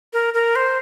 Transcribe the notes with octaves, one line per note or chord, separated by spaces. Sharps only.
A#4
A#4
C5